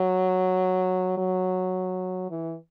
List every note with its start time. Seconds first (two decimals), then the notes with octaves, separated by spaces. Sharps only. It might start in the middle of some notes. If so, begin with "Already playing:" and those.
Already playing: F#3
1.17 F#3
2.30 E3